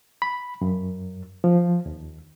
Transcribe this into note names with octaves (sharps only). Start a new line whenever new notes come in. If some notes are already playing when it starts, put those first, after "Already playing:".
B5
F#2
F3
D#2